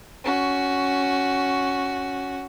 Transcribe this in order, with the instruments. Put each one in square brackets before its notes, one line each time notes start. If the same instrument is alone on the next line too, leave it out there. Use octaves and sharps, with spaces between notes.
[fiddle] C#4 F#4